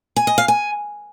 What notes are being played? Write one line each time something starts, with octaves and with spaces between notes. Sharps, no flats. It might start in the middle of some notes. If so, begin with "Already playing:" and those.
G#5
D#5
F5
G#5